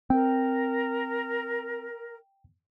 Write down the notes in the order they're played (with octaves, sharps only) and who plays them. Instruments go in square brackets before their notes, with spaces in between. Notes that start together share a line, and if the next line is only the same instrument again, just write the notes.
[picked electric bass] C4 [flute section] A#4 [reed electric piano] G5